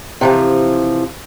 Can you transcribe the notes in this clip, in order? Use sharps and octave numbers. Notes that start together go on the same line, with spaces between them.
C3 E3 F3